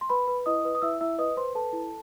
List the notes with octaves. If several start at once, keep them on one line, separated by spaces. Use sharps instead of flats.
C6
B4 B5
B4
E4 D#5 D#6
B4
D#6
E4 E5 E6
E4 E5 E6
B4 D#5 D#6
B4 C5 C6
A4 B4 A5
E4